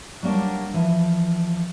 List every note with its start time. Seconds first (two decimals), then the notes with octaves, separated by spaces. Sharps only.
0.23 F#3 G3 A#3 D4
0.74 E3 F3